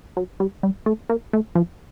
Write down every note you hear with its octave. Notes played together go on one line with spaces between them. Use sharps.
F#3
G3
G3
A3
A#3
A3
F3